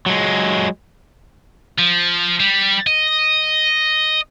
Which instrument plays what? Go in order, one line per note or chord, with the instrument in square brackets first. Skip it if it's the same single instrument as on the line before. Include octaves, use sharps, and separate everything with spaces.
[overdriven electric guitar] F#3 G#3
[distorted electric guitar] F3
G3
D#5